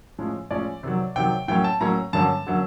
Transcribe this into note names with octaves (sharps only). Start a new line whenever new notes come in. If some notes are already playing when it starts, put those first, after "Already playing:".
A2 F3 G#3 C#4
A2 F3 G#3 C#4 D5
C3 D#3 F#3
C3 D#3 F#3 G5
A2 F#3 A#3 C#4 G5
A5
A2 F#3 A#3 C#4 A#5
G2 D3 F#3 A#3 C#4 A5
D3 F#3 A#3 C#4